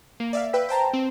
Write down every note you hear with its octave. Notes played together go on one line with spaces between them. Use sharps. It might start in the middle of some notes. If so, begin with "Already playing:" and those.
A#3
D5 E5 F5
B4 G5 E6 B6
C5 G5 A5 A#5
C4